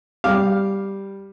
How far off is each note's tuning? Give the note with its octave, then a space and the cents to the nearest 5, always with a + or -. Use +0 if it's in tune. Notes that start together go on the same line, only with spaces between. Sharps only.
G3 +0 F5 +0 D6 +0